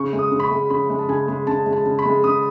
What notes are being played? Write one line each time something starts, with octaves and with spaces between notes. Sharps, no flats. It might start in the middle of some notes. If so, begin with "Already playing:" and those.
Already playing: C#3 C#6
G#3
D#6
C#3
B5
C#6
G#3
C#3 B5
G#3
A5
C#3 G#5
G#3
C#3 A5
G#3
A5
C#3
B5
G#3
C#3 D#6